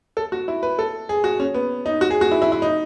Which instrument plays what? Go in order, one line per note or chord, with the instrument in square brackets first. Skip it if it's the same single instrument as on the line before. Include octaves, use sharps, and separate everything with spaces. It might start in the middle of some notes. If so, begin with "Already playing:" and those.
[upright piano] A4
F#4
E4
B4
A4
G#4
F#4
C#4
B3
D#4
F#4
G#4
F#4
E4
E4
E4
D#4